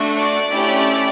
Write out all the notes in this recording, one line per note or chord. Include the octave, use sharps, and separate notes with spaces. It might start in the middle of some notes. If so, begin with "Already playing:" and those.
Already playing: A3 D4 F#4
D5
A3 C#4 E4 G4